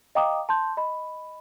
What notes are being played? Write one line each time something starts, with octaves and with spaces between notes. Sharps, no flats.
D#5 F5 G5 A#5 D6 D#6
A5 C6 G6
D#5 B5